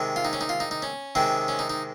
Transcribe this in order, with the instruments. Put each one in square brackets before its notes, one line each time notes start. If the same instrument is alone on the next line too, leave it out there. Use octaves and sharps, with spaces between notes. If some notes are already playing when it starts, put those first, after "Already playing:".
Already playing: [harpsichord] C3 D#3 G#3
F4
D#4
C#4
D#4
F4
D#4
D#4
C#4
C3 D#3 G#3 C4
C#4
D#4
D#4